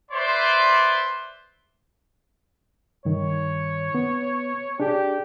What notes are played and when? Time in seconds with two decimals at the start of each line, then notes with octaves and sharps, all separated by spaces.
0.11 B4 C5 D5 E5 C6
3.05 G2 D#3 C#5
3.95 B3
4.80 D4 G4 G#4